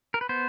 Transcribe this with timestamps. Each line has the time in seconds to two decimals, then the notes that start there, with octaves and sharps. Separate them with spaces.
0.14 A#4
0.21 B4
0.29 B3 C5